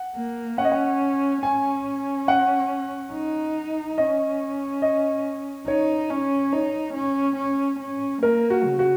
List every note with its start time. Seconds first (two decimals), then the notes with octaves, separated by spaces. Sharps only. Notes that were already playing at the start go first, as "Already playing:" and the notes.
Already playing: F#5
0.16 A#3
0.58 C#4 F#5
0.65 D#5
0.72 F#5
1.43 C#4 G#5
2.28 F#5
3.13 D#4
3.98 C#4 D#5
4.82 D#5
5.67 D#4 C#5
6.10 C#4
6.53 D#4 C#5
6.95 C#4
7.37 C#4
7.80 C#4
8.23 A#3 A#4
8.50 F#4
8.64 C#3
8.79 F#4